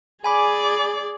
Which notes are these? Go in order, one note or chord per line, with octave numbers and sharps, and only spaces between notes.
G#4 D5 G#5 B5 D6